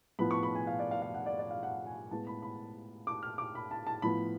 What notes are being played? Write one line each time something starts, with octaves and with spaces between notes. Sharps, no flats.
A2 F3 B3 B5
C#6
B5
G#5
F5
D5
F5
F5
F#5
D5
D5
F5
F#5
G#5
A2 G#3 B3 A5
B5
B5
D6
F6
D6
B5
A5
A5
A2 F3 B3 B5